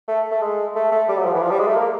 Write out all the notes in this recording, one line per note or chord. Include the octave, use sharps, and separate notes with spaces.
A3
A3
G#3
A3
A3
G3
F#3
F3
E3
F3
G3
G#3
A3
A#3